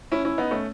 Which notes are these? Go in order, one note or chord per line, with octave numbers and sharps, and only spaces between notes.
C#4 E4
C#4 E4
B3 D#4
A3 C#4